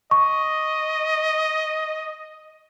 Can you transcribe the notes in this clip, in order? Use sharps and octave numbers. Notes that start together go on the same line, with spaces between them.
D#5 C#6